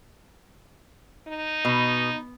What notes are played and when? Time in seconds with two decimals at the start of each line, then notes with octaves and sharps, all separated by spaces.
1.27 D#4
1.65 B2